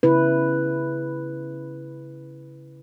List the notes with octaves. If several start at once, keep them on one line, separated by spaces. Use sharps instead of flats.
C#3 E4 B4